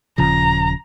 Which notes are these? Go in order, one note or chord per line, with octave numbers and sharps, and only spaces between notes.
D#1 C#3 F3 A#5